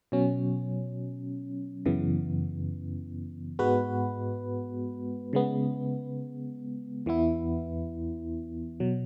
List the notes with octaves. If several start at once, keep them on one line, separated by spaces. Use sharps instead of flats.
B2 F#3 C#4
F#2 C#3 E3 B3
G#2 G#3 B3 F#4 B4
C#3 G#3 B3
E2 E3 B3 E4
B2 F#3